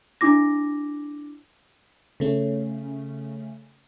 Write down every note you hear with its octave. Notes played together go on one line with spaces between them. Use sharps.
D4 E4 D6 A#6
C#3 A3 C#4